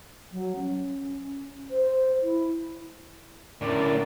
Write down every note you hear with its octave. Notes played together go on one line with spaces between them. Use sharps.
F#3
C#4
C5
E4
A2 D3 C#4 A#4 D5